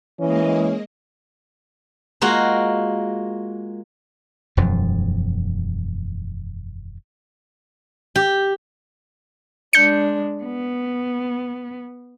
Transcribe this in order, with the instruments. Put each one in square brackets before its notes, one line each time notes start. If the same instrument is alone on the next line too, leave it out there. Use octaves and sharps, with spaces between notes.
[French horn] E3 [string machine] G#3 A#3 D#5 [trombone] C#4
[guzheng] G#3 A#3 F4 F#4
[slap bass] E1 F#2 F3
[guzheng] G4
[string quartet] G#3 D4 [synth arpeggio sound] G6 C#7
[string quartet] B3